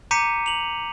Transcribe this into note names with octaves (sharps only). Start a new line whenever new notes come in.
A#5 D6 G6 B6 C#7 D#7
F7 F#7